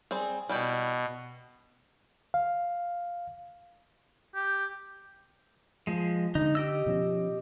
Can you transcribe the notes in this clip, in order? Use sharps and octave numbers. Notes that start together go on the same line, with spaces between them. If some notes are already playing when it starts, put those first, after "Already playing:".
G3 C4 G#4
B2 G3 E4 G4
F5
G4
F3 G#3
D3 D#4
G4 D#5 E6
B2 F3 C#4